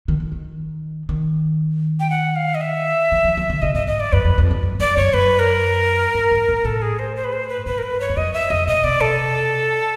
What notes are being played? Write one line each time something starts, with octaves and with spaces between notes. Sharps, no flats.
D#3
D3
D#3
D#3
G5
F#5
F5
D#5
E5
E3
F3
F3
D3
C#3 D#5
G2 D#5
G#2 D#5
D5
F#2 B4
F2
F2
G2
F#2
F2 D5
F#2 C#5
F#2 B4
A#4
G2
G#2
A2
A2 A4
G#4
C5
C5
B4
C5
B4
G2 B4
A#4
B4
C#5
F#2
F2 D#5
E5
F2 D#5
A#2 D#5
B2 D5
C3 A4